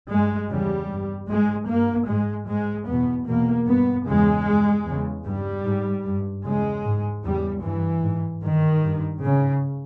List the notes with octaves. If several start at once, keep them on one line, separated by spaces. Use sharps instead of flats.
G2 G#3
E2 C#3 G3
G2
G#2 G#3
G2 A#3
G#2 G#3
G#2 G#3
E2 B2 B3
E2 B2 A#3
G2 B3
E2 C#3 G#3
G2
E2 C#3
G2 G3
G#2
G2
E2 C#3 G#3
G#2
E2 C#3 G3
G2 E3
G#2
G2 D#3
G2
G#2 C#3